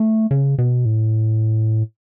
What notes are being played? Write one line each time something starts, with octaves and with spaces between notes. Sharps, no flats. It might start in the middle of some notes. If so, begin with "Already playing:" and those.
Already playing: A3
C#3
B2
A2